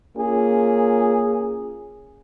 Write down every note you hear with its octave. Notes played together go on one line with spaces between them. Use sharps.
A#3 C#4 F4 G#4